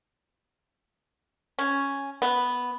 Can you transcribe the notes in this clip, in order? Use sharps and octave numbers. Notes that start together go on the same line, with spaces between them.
C#4
B3